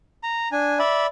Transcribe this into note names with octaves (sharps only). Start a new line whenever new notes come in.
A#5
D4 G#5
D5 E5 B5